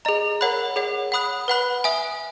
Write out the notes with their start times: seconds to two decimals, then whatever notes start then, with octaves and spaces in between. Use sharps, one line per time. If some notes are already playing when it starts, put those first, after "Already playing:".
0.05 G#4 D#5 A#5
0.41 A#4 C#5 F#5 B5 F#6
0.76 G#4 C#5 F#5
1.12 F#5 B5 D#6 F#6
1.48 B4 F#5 B5 F#6
1.84 E5 G#5 D#6